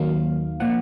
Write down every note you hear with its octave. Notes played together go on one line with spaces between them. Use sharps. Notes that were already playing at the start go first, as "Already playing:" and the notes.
Already playing: D#2 D#3 F#3 A#3 D#4 F5
A#2 F3 F#5